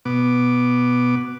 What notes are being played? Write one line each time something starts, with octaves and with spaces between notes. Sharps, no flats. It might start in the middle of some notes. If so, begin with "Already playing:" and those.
B2 B3 D6